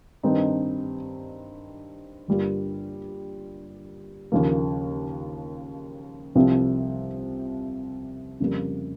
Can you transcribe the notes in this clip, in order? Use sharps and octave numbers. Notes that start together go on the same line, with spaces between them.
G2 D#3 G3 C4 D#4
G1 G2 G3 A#3 F4
D#2 C#3 F3 A#3
C2 C3 F3 C4
F2 C#3 G3 A#3